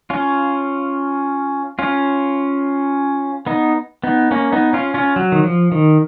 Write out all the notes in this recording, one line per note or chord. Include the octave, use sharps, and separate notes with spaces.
C#4 F4
C#4 F4
B3 D#4
B3 D#4
A#3 C#4
B3 D#4
C#4 F4
C#4 F4
F#3
D#3
F3
D#3